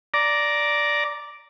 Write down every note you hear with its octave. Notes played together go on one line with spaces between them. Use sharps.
D5 A#5